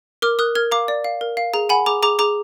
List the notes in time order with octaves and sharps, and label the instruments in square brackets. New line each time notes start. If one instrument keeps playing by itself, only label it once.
[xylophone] A#4 D6 F6
A#4 D#6 F#6
A#4 F6 G#6
F5 A#5 D6
D5
F5
A#4
F5
G#4 A#5
F#5 G#5 B5
G#4 A#5 D6
G#4 A#5 D6
G#4 A#5 D6